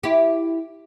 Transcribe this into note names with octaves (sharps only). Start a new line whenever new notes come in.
E4 G4